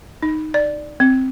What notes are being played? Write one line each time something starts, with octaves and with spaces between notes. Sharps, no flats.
D#4
D5
C4